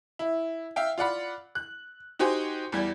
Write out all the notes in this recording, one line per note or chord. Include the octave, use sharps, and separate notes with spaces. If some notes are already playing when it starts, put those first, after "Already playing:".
E4
E5 F5 G5
F4 D5 F#5 B5
F#6
D#4 F#4 G4 C5 G#5
E2 G3 G#6